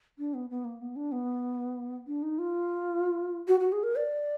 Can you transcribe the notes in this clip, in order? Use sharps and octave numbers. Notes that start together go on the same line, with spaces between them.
D4
B3
B3
A#3
B3
D4
B3
D4
D#4
F4
F#4
F#4
G#4
A#4
D5